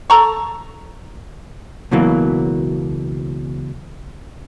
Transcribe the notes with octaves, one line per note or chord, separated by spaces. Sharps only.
A4 A#5 C#6
C#2 B2 E3 F#3 A#3